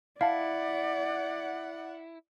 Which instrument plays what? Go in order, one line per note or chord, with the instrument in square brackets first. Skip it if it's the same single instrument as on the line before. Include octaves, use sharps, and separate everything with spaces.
[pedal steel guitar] E4 [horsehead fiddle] D5 [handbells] F5 A5 [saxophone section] F#5